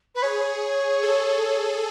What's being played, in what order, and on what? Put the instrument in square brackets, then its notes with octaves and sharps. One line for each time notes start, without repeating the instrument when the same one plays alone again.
[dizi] B4
[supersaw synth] G#4 [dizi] C#5
[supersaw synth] A4